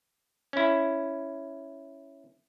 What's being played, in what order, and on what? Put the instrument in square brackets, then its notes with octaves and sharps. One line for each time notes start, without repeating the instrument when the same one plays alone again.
[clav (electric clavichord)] C#4 E4